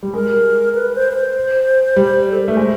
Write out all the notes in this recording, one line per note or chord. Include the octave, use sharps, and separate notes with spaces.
G3
G#3 A#4
B4
C5
B4
C5
G3
A4
A#4
A3 B4
G#3 C5